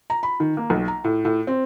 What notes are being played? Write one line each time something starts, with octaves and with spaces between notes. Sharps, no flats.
A#5
B5
D#3
A#3
B1
A#5
A2
A2
C4